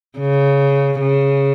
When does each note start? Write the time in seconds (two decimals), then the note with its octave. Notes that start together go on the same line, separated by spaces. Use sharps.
0.19 C#3
1.01 C#3